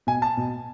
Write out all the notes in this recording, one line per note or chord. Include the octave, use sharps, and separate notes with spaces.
B2 G#5
A5
B2